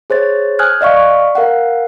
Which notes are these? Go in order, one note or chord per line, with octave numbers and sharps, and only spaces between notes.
G#4 C5 C#5 A6
G#5 D#6 F6 F#6 G#6
D5 D#5 F5 C#6
A#4 F5 F#5